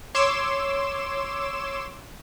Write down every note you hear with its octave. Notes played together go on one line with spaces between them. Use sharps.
C#5 C6 D6 E6 E7